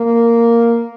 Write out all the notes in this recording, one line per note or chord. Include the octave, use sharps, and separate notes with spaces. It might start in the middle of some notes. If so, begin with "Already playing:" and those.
Already playing: A#3